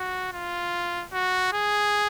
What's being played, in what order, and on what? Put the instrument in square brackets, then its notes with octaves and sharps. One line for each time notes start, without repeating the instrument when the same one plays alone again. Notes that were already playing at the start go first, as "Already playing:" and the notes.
Already playing: [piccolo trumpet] F#4
F4
F#4
G#4